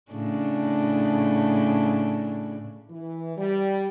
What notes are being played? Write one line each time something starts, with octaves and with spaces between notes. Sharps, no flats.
A2 C#3 D4
E3
G3